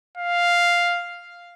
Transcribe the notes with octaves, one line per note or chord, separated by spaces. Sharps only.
F5